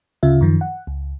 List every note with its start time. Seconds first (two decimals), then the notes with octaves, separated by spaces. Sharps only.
0.23 D2 C#3 F4 E5
0.41 F#2 D#3 F3
0.61 F#5
0.87 C#2